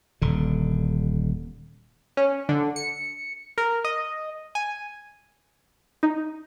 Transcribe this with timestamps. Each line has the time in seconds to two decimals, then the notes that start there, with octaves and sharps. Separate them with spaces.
0.22 D#1 D3
2.17 C#4
2.49 D3
2.76 C#7
3.58 A#4
3.85 D#5
4.55 G#5
6.03 D#4